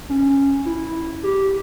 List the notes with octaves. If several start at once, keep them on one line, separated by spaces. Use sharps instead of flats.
C#4
E4
G4